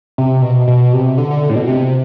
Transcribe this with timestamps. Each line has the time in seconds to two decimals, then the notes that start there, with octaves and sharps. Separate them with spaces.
0.18 C3
0.42 B2
0.68 B2
0.93 C3
1.18 D3
1.31 D3
1.43 D3
1.50 A2
1.55 B2
1.67 C3